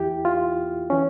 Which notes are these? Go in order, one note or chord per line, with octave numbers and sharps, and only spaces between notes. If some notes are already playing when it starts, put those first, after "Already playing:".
Already playing: E2 E3 E4 G4
F4
E3 C#4